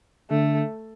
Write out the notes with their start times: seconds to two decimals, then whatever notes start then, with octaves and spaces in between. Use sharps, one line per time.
0.30 D3 A3